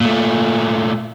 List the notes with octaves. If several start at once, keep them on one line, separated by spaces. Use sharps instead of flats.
A#2 A3